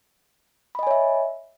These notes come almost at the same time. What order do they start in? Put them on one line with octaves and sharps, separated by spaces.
B5 D#5 G#5 C#5 E5